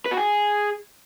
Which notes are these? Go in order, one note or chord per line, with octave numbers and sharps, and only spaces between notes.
B4
F#4
G#4